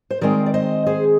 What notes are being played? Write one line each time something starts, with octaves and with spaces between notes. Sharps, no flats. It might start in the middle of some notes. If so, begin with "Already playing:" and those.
C5
D#3 G#3 C4 A#4 D5
D5
C5 D#5
G#4 C5